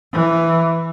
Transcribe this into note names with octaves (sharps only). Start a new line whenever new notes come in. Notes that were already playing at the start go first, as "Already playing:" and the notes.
E3